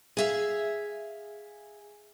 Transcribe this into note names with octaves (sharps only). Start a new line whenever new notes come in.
G#4 E5 F5